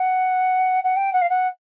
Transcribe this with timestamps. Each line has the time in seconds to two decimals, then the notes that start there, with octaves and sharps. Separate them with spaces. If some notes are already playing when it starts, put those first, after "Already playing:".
Already playing: F#5
0.84 F#5
0.96 G5
1.13 F#5
1.21 F5
1.29 F#5